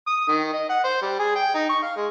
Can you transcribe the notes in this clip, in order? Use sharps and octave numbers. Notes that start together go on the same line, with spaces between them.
D#6
D#3
D#5
F#5
C5
G3
G#4
G5
D#4
C#6
F5
G#3